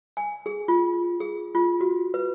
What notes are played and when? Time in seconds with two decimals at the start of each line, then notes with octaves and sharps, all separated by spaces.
0.17 G#5
0.46 G#4
0.68 F4
1.20 G#4
1.55 F4
1.81 F#4
2.14 B4